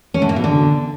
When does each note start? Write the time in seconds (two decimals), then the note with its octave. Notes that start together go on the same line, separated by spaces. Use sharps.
0.14 C#4
0.22 A2
0.29 A#3
0.36 B2
0.44 D3